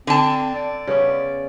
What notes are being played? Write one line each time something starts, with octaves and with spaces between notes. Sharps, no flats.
D3 C4 A5
D5
C#3 B3 C#4